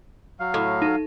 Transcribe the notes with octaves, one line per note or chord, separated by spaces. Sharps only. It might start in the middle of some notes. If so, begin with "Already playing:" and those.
F#3 F5
A2
D#4